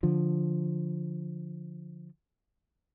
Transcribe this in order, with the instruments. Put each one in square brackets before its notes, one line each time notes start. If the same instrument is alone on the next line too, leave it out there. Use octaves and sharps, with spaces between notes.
[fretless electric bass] D3 F3